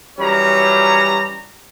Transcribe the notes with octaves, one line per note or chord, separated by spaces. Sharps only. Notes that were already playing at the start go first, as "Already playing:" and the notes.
F#2 E3 G3 C#4 C#5 A#5